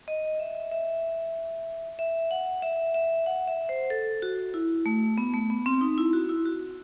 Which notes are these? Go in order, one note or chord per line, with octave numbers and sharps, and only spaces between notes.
D#5
E5
E5
E5
F#5
E5
E5
F#5
E5
C5
A4
F#4
E4
A3
B3
A3
B3
C4
D#4
E4
F#4
E4
F#4